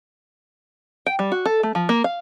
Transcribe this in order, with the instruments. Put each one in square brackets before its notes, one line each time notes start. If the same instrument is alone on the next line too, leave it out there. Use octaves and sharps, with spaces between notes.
[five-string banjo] G5
G3
F#4
A4
A3
F3
A#3
F5